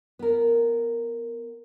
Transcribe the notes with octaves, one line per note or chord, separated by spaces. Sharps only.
B3 A#4